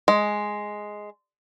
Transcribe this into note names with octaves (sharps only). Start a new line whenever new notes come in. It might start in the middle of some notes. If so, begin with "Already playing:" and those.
G#3